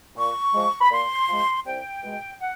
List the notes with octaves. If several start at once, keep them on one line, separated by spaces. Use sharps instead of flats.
A#2 C#6
F3 G#3
B5
A#2 C6
F3 G#3
C2 G5
B2 G#3
F#5